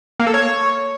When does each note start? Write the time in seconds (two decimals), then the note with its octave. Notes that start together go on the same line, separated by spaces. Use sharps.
0.20 A#3
0.27 A4
0.34 C#5